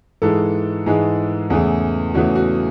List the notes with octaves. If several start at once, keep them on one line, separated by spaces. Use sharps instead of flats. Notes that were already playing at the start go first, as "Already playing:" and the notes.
G#2 E3 G#3 A4
G#2 E3 G#3 G#4
E2 C#3 E3 A3 G#4
E2 C#3 E3 A3 F#4
F#4